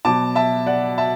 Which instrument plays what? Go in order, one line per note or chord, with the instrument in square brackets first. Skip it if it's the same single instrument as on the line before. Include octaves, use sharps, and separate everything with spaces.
[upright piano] B2 F#3 A5 D6
E5 A5
D5 F#5
E5 A5